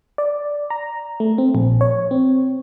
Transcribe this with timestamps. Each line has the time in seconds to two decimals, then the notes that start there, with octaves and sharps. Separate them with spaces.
0.18 D5
0.70 A#5
1.20 A3
1.38 C4
1.55 A#1
1.81 C#5
2.11 C4